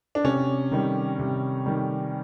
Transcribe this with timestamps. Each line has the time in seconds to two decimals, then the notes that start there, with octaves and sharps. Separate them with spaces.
0.15 D4
0.24 C3 C#4
0.71 D#3 G3
1.19 C3
1.66 D#3 G3